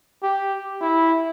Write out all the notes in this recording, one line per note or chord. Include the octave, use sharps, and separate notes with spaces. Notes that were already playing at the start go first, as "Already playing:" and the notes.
G4
E4